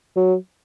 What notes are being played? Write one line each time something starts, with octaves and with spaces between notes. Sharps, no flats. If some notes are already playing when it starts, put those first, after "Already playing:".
F#3